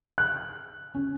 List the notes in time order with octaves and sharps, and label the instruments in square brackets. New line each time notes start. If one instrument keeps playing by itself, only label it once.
[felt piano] F#6
C#4